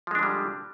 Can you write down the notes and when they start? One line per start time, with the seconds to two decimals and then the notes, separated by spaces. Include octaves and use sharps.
0.07 F3
0.11 G#3
0.15 D4
0.19 D3
0.23 G3